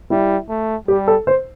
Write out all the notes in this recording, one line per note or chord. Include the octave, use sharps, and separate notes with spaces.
G3 E4
A3
G3 G4
A4
C5